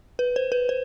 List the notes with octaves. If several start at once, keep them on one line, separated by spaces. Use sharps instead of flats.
B4
C5
B4
C5